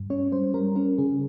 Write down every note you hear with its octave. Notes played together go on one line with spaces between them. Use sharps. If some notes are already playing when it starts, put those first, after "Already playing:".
Already playing: G2
C#4 C#5
G3 C5
G3 A#4
C#4 A#4
C#3 G#4